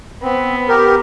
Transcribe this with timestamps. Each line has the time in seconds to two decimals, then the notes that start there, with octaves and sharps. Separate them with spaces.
0.23 B3 C4
0.68 G4 A#4